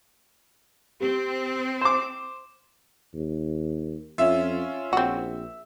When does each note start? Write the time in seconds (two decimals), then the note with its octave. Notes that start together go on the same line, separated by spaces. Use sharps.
1.00 C4 G4
1.81 C5 D6 E7
3.14 D#2
4.18 F2 C#4 F4 E5
4.93 A#1 C4 F#4